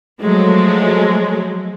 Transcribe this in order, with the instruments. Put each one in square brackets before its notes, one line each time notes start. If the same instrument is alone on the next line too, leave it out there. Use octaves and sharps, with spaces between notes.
[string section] F3 F#3 G#3 A3